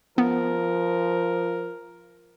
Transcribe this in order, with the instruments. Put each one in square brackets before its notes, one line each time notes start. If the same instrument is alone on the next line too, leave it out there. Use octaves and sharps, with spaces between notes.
[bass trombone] F3 [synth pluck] B3 [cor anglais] A#4